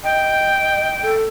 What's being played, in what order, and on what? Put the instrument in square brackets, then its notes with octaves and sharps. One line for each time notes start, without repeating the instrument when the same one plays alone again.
[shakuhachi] D#5 [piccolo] G5
[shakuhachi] A4